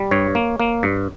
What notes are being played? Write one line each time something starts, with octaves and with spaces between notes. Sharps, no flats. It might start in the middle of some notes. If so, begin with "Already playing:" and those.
Already playing: G3
G2 C#5
A#3
A#3
G2